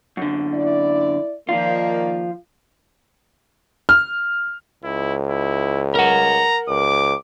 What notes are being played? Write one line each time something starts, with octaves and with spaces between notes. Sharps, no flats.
F#2 D3
E4 D5
D#3 F3 A#3 F4 D5
F6
C#2 E4
E4
A#4 F#5 A#5
C#2 D6